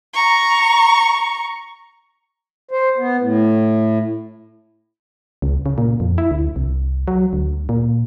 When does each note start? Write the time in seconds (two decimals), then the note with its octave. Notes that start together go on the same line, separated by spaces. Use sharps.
0.14 A#5 C#6
2.71 C5
2.98 B3
3.20 A2
5.42 C#2
5.66 C#3
5.78 A#2
6.00 F2
6.18 E4
6.31 D2
6.56 C2
7.08 F#3
7.33 D2
7.69 A#2